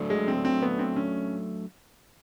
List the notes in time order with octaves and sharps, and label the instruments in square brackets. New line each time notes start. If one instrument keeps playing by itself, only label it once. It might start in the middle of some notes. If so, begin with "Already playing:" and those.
Already playing: [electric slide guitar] F#3 A3 D4
[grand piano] G#3
C4
C4
B3
C4
C#4